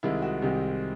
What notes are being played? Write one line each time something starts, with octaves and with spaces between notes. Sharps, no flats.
C2 C3 D#3 G#3 E4
F#4
C2 C3 D#3 G#3 G4